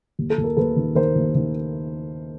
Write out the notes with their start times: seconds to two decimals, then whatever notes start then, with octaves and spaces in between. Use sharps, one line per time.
0.19 D#2
0.30 A4
0.38 D#2
0.44 A#4
0.57 D#2 A4 B4
0.76 D#3
0.95 D#3 A#4 C5
1.15 D#2
1.35 D#3